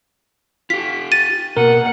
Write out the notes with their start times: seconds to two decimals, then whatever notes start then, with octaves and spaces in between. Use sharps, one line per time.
0.70 F4 G4 B6
1.12 A6 D#7
1.57 B2 A#3 A#4 F#5